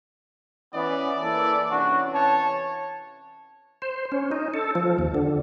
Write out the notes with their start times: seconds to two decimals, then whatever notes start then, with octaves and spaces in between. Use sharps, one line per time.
0.74 E3 B3 C#4 D5
1.22 E3 A#3 E4 A4
1.71 C3 E3 C#4 D4 F#4
2.14 C#5 A5
3.82 C5
4.12 C#4
4.31 D#4
4.54 A4
4.75 F3
4.99 D#2
5.15 D3